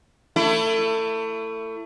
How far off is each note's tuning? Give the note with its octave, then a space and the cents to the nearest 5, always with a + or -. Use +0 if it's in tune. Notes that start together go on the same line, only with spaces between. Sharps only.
A3 +30 E4 +20